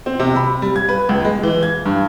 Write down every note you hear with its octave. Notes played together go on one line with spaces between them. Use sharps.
C4
C3
B5
G3
G#6
B4
C#2
G#3
E3
G#6
G2